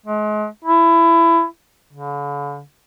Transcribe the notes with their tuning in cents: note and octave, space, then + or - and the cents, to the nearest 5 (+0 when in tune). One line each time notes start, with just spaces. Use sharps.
G#3 +35
E4 +20
D3 -45